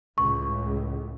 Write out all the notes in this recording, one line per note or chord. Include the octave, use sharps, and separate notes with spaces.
C#2 A2 C#6